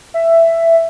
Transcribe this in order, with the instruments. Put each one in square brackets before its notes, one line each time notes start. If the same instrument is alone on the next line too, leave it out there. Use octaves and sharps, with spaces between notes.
[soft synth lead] E5